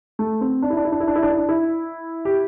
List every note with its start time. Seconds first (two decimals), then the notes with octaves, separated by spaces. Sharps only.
0.19 A3
0.41 C4
0.62 D4
0.70 E4
0.77 D4
0.85 E4
0.92 D4
1.00 E4
1.08 D4
1.15 E4
1.23 D4
1.30 E4
1.38 D4
1.49 E4
2.25 G4